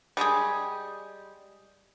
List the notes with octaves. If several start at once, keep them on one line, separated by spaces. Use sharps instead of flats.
G3 G#3 G4 G#4